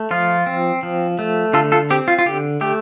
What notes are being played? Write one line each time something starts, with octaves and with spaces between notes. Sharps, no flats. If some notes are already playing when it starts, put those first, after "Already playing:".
Already playing: A3
F3 F4
C4
F3
A3
D3 F4 A4
F4 A4
C4 G4
F4
F4
D3 G4
A3 G4